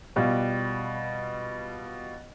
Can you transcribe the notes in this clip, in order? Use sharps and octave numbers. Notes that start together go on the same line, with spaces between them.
B2 G3 F4